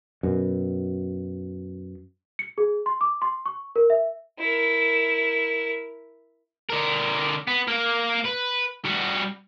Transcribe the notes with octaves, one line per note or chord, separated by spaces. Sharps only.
F#2 B2
C#7
G#4
C6
D6
C6
C#6
A#4
E5
E4 A#4
D3 A#4
B3
A#3 A#4
B4
G3 F#4